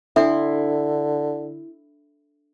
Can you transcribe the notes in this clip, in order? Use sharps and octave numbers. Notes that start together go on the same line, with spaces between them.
D3 D4 E4 A4 E5 C6